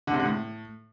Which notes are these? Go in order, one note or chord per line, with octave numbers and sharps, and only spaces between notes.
D3
C3
D3
A2